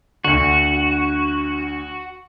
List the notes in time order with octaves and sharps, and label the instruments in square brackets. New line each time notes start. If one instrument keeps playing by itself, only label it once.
[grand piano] D2 D3 [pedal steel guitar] F#4